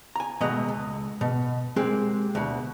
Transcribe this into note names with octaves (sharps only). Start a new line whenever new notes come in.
G#5 A#5
D#2 B2 G#3 A3 D#5 A#5
C#2
B2
G#3 A#3 C4 G4 G#4
D2 B2